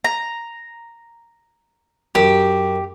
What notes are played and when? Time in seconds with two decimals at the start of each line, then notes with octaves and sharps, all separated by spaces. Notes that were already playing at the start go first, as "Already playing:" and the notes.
0.04 A#5
2.15 F#2 G4